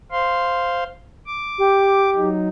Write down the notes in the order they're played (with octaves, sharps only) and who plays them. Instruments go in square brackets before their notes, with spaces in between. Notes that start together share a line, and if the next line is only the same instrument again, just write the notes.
[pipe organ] C5 F5 C6
D6
[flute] G4
[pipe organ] F#3 D#4